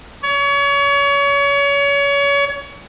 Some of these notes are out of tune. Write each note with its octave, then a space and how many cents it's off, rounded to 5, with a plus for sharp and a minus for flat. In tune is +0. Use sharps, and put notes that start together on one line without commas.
C#5 +30